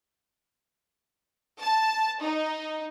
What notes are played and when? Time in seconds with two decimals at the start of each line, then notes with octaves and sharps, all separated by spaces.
1.63 A5
2.22 D#4